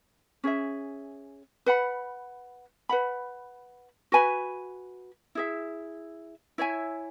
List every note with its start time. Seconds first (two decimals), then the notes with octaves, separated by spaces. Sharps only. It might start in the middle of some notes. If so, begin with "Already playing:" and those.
0.44 C#4 G#4 E5
1.66 B4 F#5 B5
2.89 B4 F#5 B5
4.12 F#4 B4 G#5 B5
5.35 E4 G#4 E5
6.58 E4 C#5 E5 G#5